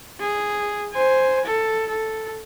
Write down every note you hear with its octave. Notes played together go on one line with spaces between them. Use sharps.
G#4
C5 G#5
A4
A4